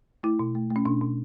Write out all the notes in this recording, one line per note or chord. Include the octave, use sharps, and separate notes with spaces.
A3 E4
B2
A3
A3
C#4
B2 D4
B2